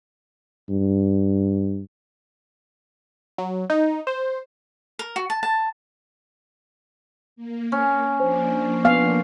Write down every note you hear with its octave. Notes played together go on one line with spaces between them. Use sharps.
G2
F#3
D#4
C5
A#4
F#4
A5
A5
A#3
C#4
F3 A#3 D4 C5
B3 F5 G#5 F6